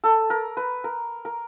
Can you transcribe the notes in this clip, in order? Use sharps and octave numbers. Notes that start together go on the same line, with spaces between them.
A4
A#4
B4
A#4
A#4